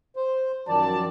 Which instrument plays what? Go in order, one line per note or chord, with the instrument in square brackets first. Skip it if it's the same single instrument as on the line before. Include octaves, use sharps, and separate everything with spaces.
[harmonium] C5
[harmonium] F#2 D#3 D5 [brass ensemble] F3 F#3 A5